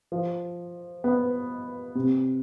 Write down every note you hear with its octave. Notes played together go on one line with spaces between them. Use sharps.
F3
B3
C3